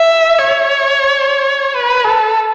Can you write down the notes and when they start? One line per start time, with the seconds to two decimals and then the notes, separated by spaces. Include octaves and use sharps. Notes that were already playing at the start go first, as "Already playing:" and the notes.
Already playing: E5
0.38 C#5
1.75 B4
2.05 A4